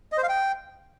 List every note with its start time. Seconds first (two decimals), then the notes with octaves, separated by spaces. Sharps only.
0.12 D#5
0.18 C5
0.23 F5
0.29 G5